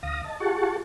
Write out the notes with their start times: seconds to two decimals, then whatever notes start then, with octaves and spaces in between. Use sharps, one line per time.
0.03 D2 F5 D#6 A#6
0.24 D#5 A5
0.40 F4 G4 G#4 F#5 A5 C#6